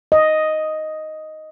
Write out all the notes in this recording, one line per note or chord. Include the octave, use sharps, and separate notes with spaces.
D#5